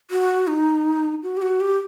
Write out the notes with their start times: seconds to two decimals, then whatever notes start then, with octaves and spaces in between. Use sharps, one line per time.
0.11 F#4
0.47 D#4
1.23 F#4
1.37 G4
1.42 F#4
1.60 G4